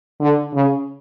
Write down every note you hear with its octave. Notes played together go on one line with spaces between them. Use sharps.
D3
C#3